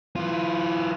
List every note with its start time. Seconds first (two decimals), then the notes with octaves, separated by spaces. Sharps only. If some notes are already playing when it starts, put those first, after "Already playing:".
0.16 E3 F4